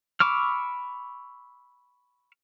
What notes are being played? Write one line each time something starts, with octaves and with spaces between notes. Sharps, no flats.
B5 C#6 D6 E6 F6